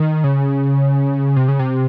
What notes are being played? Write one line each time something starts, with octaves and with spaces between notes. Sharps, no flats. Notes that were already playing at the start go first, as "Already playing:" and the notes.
Already playing: D#3
C#3
C3
C#3
C3